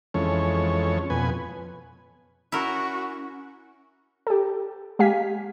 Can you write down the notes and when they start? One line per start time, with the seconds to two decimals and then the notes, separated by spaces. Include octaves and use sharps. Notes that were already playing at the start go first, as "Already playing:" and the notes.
0.14 F2 E3 G#3 C#4 A4 C#5
1.10 F2 B2 B4 G#5
2.52 C#4 E4 F#4 A#4
4.27 G4 A4
4.99 G#3 G4 F5 G#5 B6